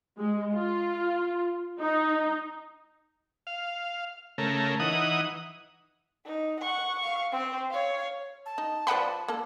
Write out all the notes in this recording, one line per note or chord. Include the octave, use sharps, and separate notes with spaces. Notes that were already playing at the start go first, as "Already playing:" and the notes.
G#3
F4
D#4
F5
C#3 A3 A#4
E3 D#4 F#5 D#6
D#4
F#5 C#6
F5 C#6
C4 C5
C#5 F5
A5
D#4
F3 B4 D5 F#5 B5
A#3 A4